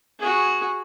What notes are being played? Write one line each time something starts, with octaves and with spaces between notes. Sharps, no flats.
F#4 G#4